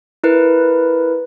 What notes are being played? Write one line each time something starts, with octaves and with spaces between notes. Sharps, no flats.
E4 A#4 B4